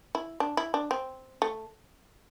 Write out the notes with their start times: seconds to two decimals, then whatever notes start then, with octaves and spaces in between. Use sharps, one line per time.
0.15 E4
0.40 D4
0.57 E4
0.74 D4
0.91 C4
1.42 A3